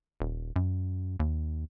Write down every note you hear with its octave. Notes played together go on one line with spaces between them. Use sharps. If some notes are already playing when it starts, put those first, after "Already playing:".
D#1
F#2
D#2